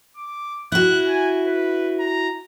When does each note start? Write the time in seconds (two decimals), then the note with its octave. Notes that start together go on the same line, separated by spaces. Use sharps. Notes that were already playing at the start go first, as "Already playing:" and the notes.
0.17 D6
0.72 E4 F#4 F#6
1.08 G#5
1.45 B4
1.99 A#5